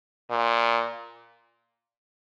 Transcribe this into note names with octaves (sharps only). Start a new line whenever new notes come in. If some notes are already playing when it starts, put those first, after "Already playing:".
A#2